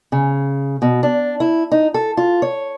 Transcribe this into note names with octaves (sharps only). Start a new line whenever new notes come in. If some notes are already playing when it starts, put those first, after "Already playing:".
C#3
B2
D4
E4
D#4
A4
F4
C#5